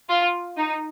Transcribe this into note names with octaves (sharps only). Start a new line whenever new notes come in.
F4
D#4